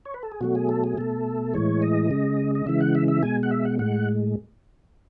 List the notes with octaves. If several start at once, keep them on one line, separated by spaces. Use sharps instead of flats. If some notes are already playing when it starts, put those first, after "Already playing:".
C#5
B4
A4
G#4
B2 F#3 A3 F#4
G#4
A4
G#4
B2 A3 A4
A2 E3 G#3 C#5
D#5
C#3 G#3
D#5
C#3 E3 G#3 E5
F#5
E5
E5
B2 G#3 G#5
F#5
E5
F#5
A2 G#3 F#5